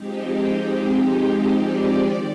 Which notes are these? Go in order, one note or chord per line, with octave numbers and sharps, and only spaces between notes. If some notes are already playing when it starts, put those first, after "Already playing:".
Already playing: F3 G#3 C4 D#4 G4
D5
D#3